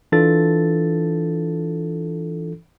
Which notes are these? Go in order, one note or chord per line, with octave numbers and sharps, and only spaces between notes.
E3 D4 F4 A4 A6